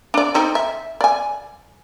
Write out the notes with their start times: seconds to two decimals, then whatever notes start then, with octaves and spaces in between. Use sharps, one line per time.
0.14 D4 D5
0.34 C4 D#4 A4
0.55 E5
1.01 D5 G#5